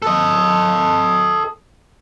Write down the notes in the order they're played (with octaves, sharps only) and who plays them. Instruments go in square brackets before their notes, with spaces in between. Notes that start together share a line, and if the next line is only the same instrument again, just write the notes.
[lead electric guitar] A4 D#5